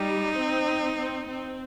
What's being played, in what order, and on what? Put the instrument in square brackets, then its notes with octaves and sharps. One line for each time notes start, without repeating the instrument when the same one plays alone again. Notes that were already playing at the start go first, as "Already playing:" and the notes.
Already playing: [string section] G3 [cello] D#4
[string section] C4
C4
C4